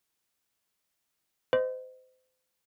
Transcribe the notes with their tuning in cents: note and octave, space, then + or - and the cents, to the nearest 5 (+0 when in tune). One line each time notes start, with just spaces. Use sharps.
C5 -30 D#5 +0